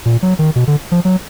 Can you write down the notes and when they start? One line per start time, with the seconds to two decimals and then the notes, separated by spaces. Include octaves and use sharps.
0.06 A#2
0.23 F#3
0.39 D#3
0.56 B2
0.67 D3
0.92 F3
1.05 F#3